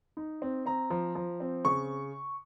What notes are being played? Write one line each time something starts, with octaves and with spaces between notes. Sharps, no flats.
D#4
C4
C4 A#5
F3
F3
C4
C#3 C#6